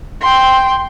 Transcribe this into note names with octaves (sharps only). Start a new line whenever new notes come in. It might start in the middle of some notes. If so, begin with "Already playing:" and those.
G5 C6